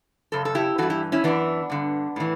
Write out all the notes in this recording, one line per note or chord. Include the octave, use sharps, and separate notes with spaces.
F#2 C#3 A4
A4
E4 G4
G2 E3 F#4 A4
E4 G4
C#4 E4
F#2 E3 B3 D4
G2 D3
A2 E3